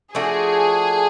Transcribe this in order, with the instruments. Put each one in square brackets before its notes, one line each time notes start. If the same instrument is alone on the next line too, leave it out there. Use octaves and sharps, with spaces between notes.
[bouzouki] F3 A3 D4 F#4 [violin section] G#4